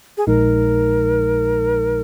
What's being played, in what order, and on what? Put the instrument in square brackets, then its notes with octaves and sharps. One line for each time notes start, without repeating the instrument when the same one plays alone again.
[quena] G#4
[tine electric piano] A#1 A#2 F3 G#3 D#4 [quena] A#4